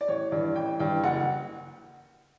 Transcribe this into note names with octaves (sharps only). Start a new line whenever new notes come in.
D5
A1 C#5
G2 E3 D5
A1 G5
G2 E3 G5
F#1 F#5